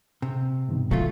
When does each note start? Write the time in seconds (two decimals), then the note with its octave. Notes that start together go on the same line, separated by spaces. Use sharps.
0.22 C3
0.69 G2 B2 D#3
0.91 D3 F#3 A3 F4